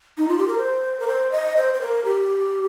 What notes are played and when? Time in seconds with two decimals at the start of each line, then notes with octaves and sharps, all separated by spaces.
0.18 D#4
0.28 F4
0.38 G4
0.48 A#4
0.58 C5
1.00 A#4
1.08 C5
1.32 D#5
1.57 C5
1.74 C5
1.81 A#4
2.05 G4